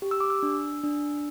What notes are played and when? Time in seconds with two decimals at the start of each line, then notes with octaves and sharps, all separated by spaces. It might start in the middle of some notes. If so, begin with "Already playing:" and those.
0.02 G4
0.11 E6
0.20 D6
0.30 E6
0.43 D4
0.84 D4